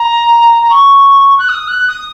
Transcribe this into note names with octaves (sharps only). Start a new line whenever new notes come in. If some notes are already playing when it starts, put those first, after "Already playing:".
Already playing: A#5
A#5
C#6
F#6
D#6
F#6
D#6